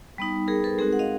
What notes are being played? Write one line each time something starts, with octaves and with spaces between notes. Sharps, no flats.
G3 B3 D#4
G#4 A#4
A4 B4
G#3 C4 D#4 F#4 G#4 A#4
F#5
D#5 F5